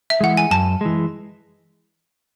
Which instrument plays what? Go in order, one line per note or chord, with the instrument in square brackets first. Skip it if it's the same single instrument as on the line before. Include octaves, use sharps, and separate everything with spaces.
[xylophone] E5
[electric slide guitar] E3 G#3 [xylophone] F#5
[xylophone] G#5
[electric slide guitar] F#2 [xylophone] A5
[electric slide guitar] E3 G#3